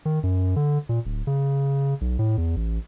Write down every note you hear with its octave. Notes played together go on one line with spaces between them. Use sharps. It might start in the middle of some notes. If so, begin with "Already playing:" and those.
D#3
F#2
D3
A#2
D1
C#3
B1
A2
E2
A1